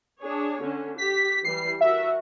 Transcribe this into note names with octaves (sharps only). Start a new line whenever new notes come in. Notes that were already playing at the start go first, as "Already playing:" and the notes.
D4 G#4 C#5
D3 C#4
G4 B6
E3 G3 C7
F#4 A#4 E5